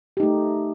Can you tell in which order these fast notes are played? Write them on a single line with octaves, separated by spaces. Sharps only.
G4 D#4 A3